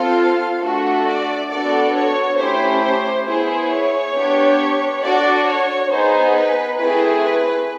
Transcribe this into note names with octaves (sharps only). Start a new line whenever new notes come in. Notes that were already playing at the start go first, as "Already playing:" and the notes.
Already playing: C4 F4 A4 F5
A3 D4 F#4 A4
D5
B3 D4 F#4 A4 D5
C#5
A3 C#4 E4 G4 C5
C5
B3 E4 G#4 C5
C#5
B3 D4 G4
D4 F#4 A4 D5
C#5
B3 D#4 G#4 C5
B4
A3 C4 E4 G#4 B4
B4